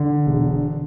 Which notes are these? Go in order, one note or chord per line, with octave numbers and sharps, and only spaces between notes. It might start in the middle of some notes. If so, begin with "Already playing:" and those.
Already playing: D3
E1